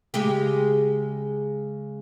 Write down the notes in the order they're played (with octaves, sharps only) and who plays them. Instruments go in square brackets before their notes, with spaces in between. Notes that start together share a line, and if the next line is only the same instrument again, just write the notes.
[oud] C#3 G#3 G4